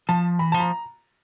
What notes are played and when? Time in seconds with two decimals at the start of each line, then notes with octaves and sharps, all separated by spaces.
0.09 F3 A5
0.39 E3 B5
0.52 F3 A5
0.60 A#5